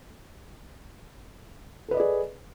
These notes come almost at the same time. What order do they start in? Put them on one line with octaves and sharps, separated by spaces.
A4 B4 D#5 D5 G#4